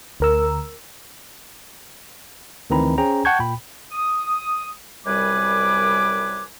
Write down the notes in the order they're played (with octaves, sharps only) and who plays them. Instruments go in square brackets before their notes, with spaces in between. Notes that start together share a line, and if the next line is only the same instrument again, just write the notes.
[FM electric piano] D2 A#4 E6
[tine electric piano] D2 D#3 E3 C4 A#5 B5
C#4 G#4 C5 G5 A#5
F#5 G5 A5 C#6 G6 G#6
A#2 G5 B5
[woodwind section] D#6
C2 F#2 G3 B4 G#5 D6